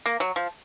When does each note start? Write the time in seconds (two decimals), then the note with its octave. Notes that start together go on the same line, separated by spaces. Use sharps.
0.06 A#3
0.20 F#3
0.36 F3